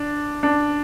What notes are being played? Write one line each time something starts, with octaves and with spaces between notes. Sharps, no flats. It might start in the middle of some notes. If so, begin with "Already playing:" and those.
Already playing: D4
D4